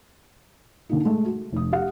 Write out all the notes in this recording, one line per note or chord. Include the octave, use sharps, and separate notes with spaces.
D3 A#3 D#4
G#3 A3
F#4
F1 D#6
G4 F5 F#5